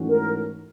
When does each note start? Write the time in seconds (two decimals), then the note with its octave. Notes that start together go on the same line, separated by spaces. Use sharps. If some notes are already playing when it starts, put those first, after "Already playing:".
Already playing: G#2 E3 A3 C#4 F#4
0.09 A#4